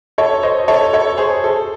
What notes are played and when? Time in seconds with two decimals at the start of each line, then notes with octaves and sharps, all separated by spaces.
0.18 A4 C#5
0.43 C5 D#5
0.68 A4 C#5
0.93 A4 C#5
1.18 G#4 C5
1.44 A4